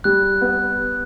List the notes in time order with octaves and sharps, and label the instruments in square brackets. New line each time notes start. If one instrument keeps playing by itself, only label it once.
[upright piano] G3 [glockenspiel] F#6
[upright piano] B3